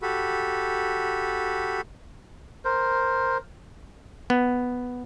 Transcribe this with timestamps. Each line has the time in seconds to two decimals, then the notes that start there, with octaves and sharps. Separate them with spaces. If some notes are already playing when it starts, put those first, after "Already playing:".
0.02 F#4 G4 A4 B5
2.65 A#4 C5
4.30 B3